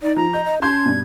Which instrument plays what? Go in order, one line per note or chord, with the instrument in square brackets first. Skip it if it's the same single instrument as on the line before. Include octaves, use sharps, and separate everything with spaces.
[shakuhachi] D#4 [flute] D5
[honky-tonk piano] F3 [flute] A#5
[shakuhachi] D#5 [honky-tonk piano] G6
[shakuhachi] D#5
[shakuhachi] C#4 [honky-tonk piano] A5 C6 G6 [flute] G#6
[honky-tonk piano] G2 B2